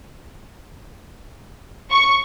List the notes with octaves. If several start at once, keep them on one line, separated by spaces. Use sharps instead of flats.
C#6